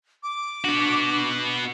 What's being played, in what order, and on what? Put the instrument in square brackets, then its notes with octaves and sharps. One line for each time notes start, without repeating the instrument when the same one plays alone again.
[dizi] D6
[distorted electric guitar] B3 F#4 [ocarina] D4